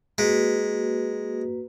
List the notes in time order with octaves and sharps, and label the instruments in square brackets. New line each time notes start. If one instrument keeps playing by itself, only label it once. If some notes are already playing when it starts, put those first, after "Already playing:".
[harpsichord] G#3 [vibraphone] A#3 F#4 B4